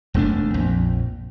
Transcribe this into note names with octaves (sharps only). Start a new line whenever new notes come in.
E1 D#2 A3 D4
A#1 F2